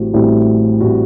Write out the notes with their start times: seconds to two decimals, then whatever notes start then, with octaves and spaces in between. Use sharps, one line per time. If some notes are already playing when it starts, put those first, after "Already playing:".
Already playing: A1 A2 G3 C4 F#4
0.13 A1 A2 G3 C4 F#4
0.81 A2 G3 C4 F#4